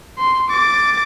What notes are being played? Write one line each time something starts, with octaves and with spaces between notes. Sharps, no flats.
C6
D6 A6